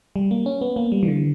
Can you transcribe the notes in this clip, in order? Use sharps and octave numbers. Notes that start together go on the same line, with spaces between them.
G3
A#3
C#4
B3
A#3
G3
E3
D3